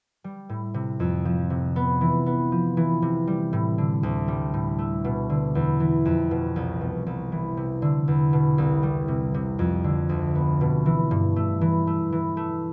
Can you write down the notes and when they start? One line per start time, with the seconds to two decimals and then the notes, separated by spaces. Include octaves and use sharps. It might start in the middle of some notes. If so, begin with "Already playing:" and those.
0.24 G3
0.49 A2
0.74 C3
1.00 F2
1.25 F3
1.50 C3
1.76 B3
2.01 E3
2.26 B3
2.52 F3
2.77 E3
3.02 C3
3.27 G3
3.53 A2
3.78 D3
4.03 D2
4.28 G3
4.54 A2
4.79 A3
5.04 B2
5.30 D3
5.55 E2
5.80 E3
6.05 F2
6.31 B2
6.56 C2
6.81 B2
7.06 C2
7.32 E3
7.57 C3
7.82 D3
8.08 E2
8.33 B2
8.58 C2
8.83 G3
9.08 C3
9.34 C3
9.59 F2
9.84 D3
10.09 D2
10.35 B3
10.61 B2
10.86 E3
11.11 G2
11.36 A3
11.61 E3
11.87 A3
12.12 E3
12.37 A3